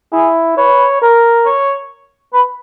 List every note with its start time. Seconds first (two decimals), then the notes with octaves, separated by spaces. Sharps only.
0.13 E4 G#4
0.57 B4 C#5
1.02 A#4
1.46 C#5
2.33 B4